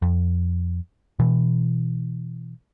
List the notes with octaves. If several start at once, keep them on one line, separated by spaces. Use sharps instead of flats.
F2
B2 E3